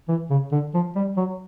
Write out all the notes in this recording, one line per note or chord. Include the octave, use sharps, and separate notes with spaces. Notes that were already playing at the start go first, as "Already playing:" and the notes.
E3
C#3
D3
F3
G3
F#3